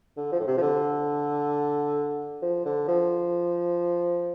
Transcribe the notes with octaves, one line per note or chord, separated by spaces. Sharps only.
D3
F3
A2
C3
F3
D3
F3
D3
F3